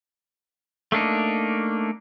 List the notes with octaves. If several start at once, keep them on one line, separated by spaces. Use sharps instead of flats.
A3 A#3 D4 D#4